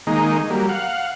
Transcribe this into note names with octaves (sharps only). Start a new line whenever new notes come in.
D#3 G#3 A#3 D#4
F#3 G3 A#3
F5 F#5